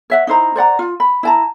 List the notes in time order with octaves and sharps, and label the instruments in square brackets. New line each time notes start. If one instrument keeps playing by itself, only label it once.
[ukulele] C#5 E5 F#5
D#4 E4 C5 A#5
C5 D5 F#5 A#5
F4
B5
E4 A5 A#5